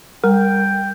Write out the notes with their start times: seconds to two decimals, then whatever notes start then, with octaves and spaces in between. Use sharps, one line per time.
0.24 G3 A#4 G5